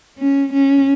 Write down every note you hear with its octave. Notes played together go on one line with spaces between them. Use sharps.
C#4
C#4